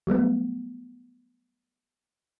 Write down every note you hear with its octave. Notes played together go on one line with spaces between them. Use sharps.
F#3 G3 A3 B3